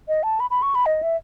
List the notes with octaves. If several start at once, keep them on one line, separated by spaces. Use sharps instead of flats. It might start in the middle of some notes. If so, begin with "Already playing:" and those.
D#5
A5
B5
B5
C#6
B5
D#5
E5